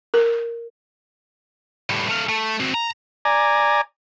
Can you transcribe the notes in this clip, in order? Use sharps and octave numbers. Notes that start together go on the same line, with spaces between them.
A#4
A2 G3
A3 F5
A3
C4 F#4
A#5
D5 G#5 A#5